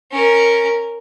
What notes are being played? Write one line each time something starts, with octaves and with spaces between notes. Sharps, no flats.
C#4 A#4